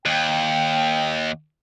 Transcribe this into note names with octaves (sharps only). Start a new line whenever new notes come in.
D#2 G5